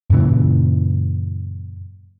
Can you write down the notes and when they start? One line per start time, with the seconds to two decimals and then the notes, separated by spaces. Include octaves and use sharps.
0.10 F#2 A#2 C#3 E3